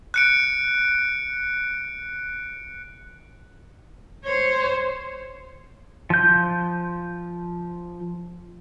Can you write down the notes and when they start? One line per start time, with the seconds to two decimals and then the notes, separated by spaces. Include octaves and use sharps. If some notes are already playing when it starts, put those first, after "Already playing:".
0.14 F#6 C#7 D7
4.24 C5 C#5
6.10 F3 G6